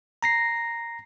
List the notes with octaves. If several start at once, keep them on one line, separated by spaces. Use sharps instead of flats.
A#5 A#6 C7